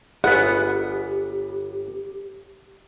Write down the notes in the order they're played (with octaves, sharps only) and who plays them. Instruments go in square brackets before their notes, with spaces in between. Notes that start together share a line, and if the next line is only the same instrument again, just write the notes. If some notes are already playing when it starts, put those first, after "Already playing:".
[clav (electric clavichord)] G1 B3 [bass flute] G4 [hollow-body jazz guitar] G#4 B4 [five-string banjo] F#5